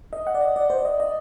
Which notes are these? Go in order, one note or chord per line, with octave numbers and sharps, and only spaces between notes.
D#5
F#5
D5
D#5
D5
C5
D5
D#5
D#5